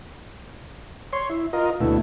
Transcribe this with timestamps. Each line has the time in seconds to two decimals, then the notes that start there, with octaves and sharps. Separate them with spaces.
1.13 C#5 C6
1.30 E4
1.53 F4 A#4 D#5
1.81 D2 B2 A3 E4